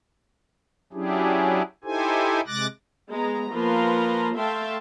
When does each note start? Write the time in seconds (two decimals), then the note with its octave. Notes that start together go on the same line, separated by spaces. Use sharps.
0.93 F#3 C#4 D4 E4 G4 G#4
1.84 D#4 E4 G4 A4 C5 G#5
2.47 C3 G#3 D6 F#6 A6 A#6
3.10 G#3 B3 A#5
3.53 F3 A#3 B4 F5 A#5 C6
4.39 A3 E5 F5 G5 A5 C6